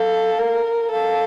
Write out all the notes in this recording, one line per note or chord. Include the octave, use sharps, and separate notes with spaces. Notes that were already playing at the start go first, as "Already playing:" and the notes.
Already playing: A4 F5
A#4
A4 F5